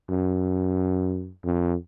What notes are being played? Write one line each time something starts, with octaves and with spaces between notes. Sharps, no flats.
F#2
F2